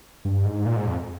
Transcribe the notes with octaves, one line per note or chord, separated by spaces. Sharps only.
G2
G#2
A#2
G#2
F2